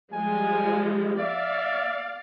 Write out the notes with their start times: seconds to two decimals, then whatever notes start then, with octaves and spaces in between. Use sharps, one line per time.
0.13 F3 G3 G#3 G#5
1.20 D5 E5 F5